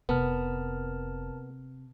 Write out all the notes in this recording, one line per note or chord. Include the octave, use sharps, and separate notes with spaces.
F1 C3 B3 A#4 A5 F6